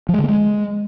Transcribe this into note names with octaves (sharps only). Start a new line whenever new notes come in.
F3
G#3
D3
A#3
G#3